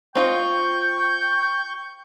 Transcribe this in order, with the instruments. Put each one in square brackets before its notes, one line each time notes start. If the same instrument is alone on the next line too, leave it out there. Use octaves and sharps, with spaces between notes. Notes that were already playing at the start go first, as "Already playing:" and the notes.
[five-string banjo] C4 F4 D#5 [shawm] G5 [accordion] C#6 G6